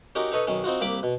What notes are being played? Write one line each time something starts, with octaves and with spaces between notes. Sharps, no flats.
C#4 D#4 F#4 G4 A#4
D#4 A4 B4 C#5 D#5
B1 D#3 C#4
C4 D#4 F4 F#4
C2 A#3 G4 B5 D6
B2